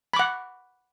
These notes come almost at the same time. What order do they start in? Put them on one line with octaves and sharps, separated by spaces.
B5 D6 F#5